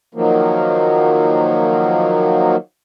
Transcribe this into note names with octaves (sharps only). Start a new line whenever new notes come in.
D#3 F3 F#3 A#3